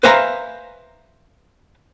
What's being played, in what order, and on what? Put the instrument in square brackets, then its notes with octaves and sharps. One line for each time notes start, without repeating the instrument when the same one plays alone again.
[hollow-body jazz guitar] B4 C5 E5 F5 G#5 A#5